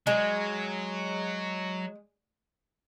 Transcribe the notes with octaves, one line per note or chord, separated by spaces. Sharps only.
F#3 G#3